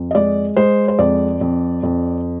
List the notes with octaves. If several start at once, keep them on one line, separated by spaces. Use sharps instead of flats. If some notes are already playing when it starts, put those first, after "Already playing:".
Already playing: F2
D#5
G#3 D5
G#3 C5
C5
F2 D5
F2
F2